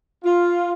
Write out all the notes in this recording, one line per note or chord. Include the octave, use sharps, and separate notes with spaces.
F4